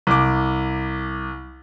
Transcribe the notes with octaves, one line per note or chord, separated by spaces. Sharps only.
C2 D6